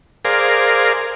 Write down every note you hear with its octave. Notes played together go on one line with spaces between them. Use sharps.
G#4 A#4 C5 D5 F5